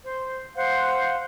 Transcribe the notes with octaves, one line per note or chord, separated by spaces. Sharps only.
C5
C5 F5 F#5